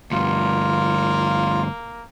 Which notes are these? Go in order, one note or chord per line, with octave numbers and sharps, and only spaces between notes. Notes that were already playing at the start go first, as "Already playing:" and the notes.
D2 G2 A#3 F4